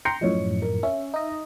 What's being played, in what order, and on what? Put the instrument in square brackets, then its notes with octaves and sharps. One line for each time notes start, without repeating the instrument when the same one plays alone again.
[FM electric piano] G5 A#5 C6 [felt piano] C#7
[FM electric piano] F#2 A2 F3 [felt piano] C#5 D#5
[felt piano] A#4
[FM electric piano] C#4 [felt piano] E5
[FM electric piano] D#4 D#5